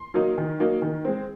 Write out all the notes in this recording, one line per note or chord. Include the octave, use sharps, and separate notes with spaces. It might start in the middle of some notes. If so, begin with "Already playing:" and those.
Already playing: C6
F#3 A#3 D#4
D#3
F#3 A#3 D#4
D#3
G#3 C4